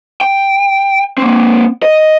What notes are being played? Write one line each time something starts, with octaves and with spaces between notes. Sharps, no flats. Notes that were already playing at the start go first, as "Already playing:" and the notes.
G5
A#3 C4
D#5